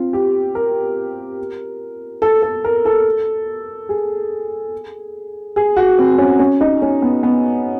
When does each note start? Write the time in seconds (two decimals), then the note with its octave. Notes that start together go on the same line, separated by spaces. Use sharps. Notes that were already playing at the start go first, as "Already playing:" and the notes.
Already playing: C4 F4
0.13 G4
0.55 A#4
2.22 A4
2.42 A4
2.64 A#4
2.85 A4
3.89 G#4
5.56 G#4
5.76 F#4
5.99 C4
6.18 C#4
6.39 C#4
6.61 D#4
6.82 C#4
7.02 B3
7.23 B3